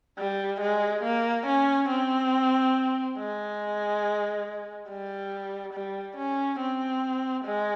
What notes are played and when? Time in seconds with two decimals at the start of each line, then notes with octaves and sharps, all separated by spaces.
0.18 G3
0.61 G#3
1.04 A#3
1.46 C#4
1.89 C4
3.18 G#3
4.89 G3
5.74 G3
6.17 C#4
6.60 C4
7.45 G#3